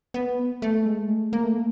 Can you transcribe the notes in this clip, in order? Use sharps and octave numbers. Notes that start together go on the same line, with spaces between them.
B3
A3
G#3
A3
A#3
A3
A#3